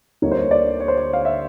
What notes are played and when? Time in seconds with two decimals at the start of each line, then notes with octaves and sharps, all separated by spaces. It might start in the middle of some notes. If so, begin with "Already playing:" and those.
0.22 D2 D3 G3 A#3 D#4 C#5
0.32 C5
0.37 C#5
0.51 D5
0.66 C#5
0.80 C#5
0.88 C5
0.97 C#5
1.13 F5
1.25 E5